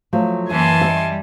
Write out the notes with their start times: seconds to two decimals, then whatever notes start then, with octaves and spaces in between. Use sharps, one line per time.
0.13 F3 F#3 A3
0.50 F#2 E3 A#3 E5 G#5 A5 C6
0.81 G3 D#5 E5